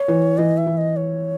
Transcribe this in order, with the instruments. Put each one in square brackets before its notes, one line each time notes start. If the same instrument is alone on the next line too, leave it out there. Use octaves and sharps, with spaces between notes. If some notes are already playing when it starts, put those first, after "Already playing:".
Already playing: [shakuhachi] C#5
[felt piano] E3
[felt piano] E3 [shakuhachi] D#5
[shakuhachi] E5
[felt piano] E3
[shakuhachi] D#5
C#5